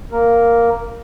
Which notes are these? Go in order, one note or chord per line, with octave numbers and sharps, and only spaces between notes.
A#3 A#4